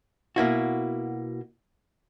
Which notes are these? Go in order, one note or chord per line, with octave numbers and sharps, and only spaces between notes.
B2 A#3 E4 F#4